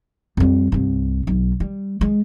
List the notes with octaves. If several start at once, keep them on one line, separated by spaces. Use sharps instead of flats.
F2 G3
C2 G2
B1
G3
G#3